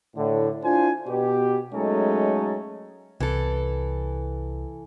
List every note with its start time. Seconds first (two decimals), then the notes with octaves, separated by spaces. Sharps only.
0.16 A2 D3
0.63 D4 E4 F4 C5 G#5
1.07 B2 G4
1.74 F#3 G#3 A3 C#4 D#4 A4
3.20 C2 E3 A4